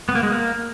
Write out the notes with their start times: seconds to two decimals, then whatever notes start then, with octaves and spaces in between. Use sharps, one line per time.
0.09 B3
0.15 A#3
0.23 G#3
0.31 A#3